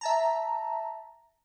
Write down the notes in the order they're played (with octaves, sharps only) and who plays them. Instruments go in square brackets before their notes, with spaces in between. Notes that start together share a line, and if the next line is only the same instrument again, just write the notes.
[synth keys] E5 A5 A#5